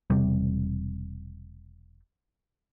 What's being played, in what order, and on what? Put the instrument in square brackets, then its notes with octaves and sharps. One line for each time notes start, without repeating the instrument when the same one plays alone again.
[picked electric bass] E1 C3 G3